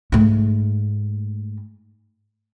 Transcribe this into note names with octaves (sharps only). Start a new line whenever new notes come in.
G#2 A3